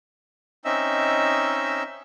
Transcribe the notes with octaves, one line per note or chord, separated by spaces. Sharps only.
C4 C#4 D#4 D#5 E5 E6